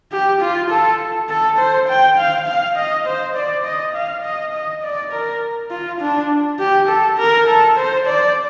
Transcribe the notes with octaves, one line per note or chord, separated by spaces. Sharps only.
G4
F4
A4
A4
C5
G5
F5
F5
D#5
C5
D5
D#5
F5
D#5
D#5
D5
A#4
F4
D4
G4
A4
A#4
A4
C5
D5